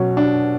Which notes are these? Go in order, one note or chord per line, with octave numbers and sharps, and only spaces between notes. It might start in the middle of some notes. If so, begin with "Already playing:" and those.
Already playing: B2 F#3 C#4
D4